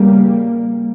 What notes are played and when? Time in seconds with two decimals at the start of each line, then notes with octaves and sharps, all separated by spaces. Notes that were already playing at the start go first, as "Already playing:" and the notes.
Already playing: E2 C#3 G3 A#3